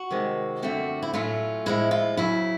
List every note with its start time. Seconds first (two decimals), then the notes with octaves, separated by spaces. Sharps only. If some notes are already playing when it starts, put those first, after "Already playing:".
Already playing: F#4
0.10 C3 D#3 G#3 C4
0.62 F#2 D3 F3 A3 C4 F#4
1.03 E4
1.14 A2 F#3 A3 C#4 F4
1.66 A2 F3 G#3 E4
1.91 F4
2.17 F2 C#3 F#3 E4